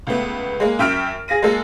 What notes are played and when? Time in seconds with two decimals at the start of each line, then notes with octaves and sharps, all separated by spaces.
0.07 C#2 A3 B3
0.60 G#3 A#3
0.79 F#2 E5 G5 F6 D7 F7
1.28 G#4 F5 A#6 D#7
1.42 G#3 A#3 A4